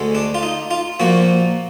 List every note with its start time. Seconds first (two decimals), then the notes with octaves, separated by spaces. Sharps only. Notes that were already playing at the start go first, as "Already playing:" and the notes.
Already playing: D2 D3 G#3
0.15 D4
0.35 F4
0.43 D#4
0.71 F4
1.00 A#2 F3 A#3 F#4